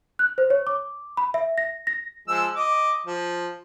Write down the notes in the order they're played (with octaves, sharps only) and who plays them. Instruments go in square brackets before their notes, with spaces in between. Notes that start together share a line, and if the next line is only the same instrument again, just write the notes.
[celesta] F#6
C5
C#5
D6
B5
E5
A#6
A#6
[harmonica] F3 G#3 E6
D#5 D6
F3